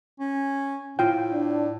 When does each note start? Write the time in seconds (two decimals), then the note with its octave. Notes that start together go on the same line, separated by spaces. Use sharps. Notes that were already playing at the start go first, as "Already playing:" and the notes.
0.20 C#4
0.99 A2 F4 G5
1.31 D4